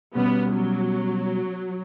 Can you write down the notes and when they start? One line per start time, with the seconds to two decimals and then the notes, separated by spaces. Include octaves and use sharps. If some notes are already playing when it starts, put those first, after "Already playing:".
0.15 B2 G3 B3 C#4
0.54 F#3